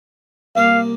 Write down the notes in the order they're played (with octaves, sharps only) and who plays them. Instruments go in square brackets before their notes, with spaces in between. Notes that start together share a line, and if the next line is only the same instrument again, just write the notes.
[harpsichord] C2 A#3 D5 [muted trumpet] F5